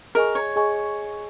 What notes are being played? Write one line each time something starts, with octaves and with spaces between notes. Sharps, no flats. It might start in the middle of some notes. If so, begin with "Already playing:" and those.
G#4 A#4 D#5 G#5 C#6
C#5
G#4 D#5 G#5 C#6